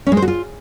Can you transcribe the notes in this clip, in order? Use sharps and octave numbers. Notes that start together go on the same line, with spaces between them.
C#4
G#3
C5
F#4
F4